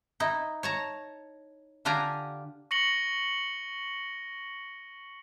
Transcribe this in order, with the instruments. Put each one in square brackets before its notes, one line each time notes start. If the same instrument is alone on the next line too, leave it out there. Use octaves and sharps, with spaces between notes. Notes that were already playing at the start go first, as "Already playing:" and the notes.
[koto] D#4 E4
C#5 A5 A#5
D3 D4 F4 G4 G#5 A#5
[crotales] C#6 A#6 C#7 F#7 G7